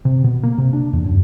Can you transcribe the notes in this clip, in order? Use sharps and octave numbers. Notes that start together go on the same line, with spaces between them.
C3
B2
A#3
C3
D4
E2
F#2